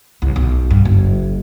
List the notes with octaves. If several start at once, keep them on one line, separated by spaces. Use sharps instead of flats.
C2
B1
G2
F#1